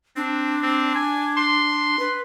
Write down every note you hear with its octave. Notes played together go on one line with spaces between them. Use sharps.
C4 D4
C4
G#5
C6
B4